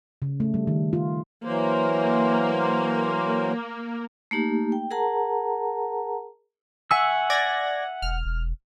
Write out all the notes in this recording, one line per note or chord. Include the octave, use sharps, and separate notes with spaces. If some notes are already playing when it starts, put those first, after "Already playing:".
C#3
A3
G3
D#3
F4
E3 F#3 A#3 A#4 C5
A3 A#3 D#4 G4
G5
G#4 A#4 F#5 A5 A#5
E5 F#5 G#5 C#6 E6
D5 G#6 A#6
E1 F6
E1